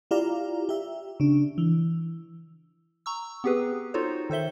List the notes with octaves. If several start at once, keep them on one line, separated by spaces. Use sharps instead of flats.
E4 F4 G4 D5 F5 A#5
G4 E5
C#3 D4
E3
A#5 C#6 E6
B3 C4 G4 G#4 B4
D#4 F4 F#4 A4 C5 C#5
D#3 A4 C5 E5 G7